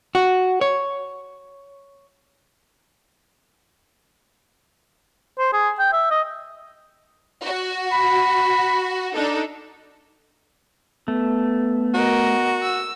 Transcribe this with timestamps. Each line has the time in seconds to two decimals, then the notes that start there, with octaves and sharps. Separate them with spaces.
0.15 F#4
0.61 C#5
5.39 C5
5.53 G#4
5.79 G5
5.93 E5
6.11 D#5
7.44 F#4
7.92 B5
9.15 D4 D#4 A4
11.08 A3 B3
11.94 F#4 A#4 D#5
12.62 E6